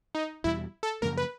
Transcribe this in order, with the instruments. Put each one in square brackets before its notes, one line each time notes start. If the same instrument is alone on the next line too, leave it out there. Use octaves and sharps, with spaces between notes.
[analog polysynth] D#4
[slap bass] E2 B2 G3 [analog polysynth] E4
[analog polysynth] A4
[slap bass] F#2 C#3 F3 A#3 [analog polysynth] A#4
[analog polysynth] B4